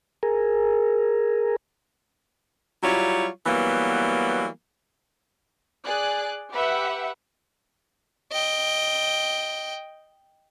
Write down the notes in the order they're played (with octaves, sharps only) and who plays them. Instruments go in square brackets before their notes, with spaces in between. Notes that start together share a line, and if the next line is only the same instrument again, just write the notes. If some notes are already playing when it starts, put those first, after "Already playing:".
[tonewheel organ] G#4 A#4
[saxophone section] F#3 G3 E4 F4 C#5
E3 F#3 G3 A#3 B3
[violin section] G#4 D5 F#6
G4 B4 E5 F#5
[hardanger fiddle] D#5 G5